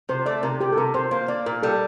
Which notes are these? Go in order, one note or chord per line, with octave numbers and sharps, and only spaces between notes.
C3 C5
A3 D5
C3 A#4
C3 G4
A4
C3 A#4
C3 C5
A#3 C5
A#3 D5
A#2 A#4
G3 A4